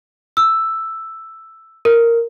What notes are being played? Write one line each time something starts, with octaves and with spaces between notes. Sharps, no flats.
E6
A#4